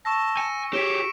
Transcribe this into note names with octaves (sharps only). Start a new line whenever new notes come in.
A5 C#6 E6 A#6
G#5 C#7
G4 G#4 C#5 B6 D7 E7